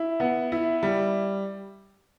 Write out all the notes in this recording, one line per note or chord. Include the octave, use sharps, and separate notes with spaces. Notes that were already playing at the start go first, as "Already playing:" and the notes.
Already playing: E4
B3
E4
G3